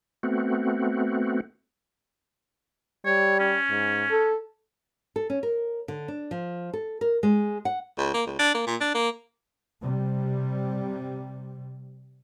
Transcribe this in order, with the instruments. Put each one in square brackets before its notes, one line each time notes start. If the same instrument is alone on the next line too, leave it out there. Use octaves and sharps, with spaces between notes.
[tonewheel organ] A3 B3 C4 F#4
[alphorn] G3 [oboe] C#5
[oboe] C#4
[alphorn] G#2
A4
[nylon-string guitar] A4
C#4
A#4
D3
D4
F3
A4
A#4
G#3
F#5
[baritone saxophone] C#2
A#3
C#2
D4
A#3
A#2
D4
A#3
[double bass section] C3 G3